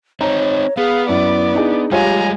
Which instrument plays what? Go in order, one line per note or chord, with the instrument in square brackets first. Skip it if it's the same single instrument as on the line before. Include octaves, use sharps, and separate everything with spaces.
[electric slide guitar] C4 D#4 [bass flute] C#5 [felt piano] A#5
[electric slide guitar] B3 [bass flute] G#4 [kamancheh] F5
[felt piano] F#2 [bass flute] E4 [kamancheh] D5
[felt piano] D4 D#4 G#4
[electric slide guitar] G3 G#3 [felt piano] F4 C#5 F5 [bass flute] G4 [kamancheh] G#5 A#5